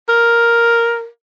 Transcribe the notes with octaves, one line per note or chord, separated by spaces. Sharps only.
A#4